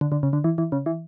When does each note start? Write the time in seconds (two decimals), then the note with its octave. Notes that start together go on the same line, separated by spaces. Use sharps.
0.01 D3
0.12 D3
0.23 C#3
0.33 D3
0.44 E3
0.58 E3
0.72 C#3
0.86 E3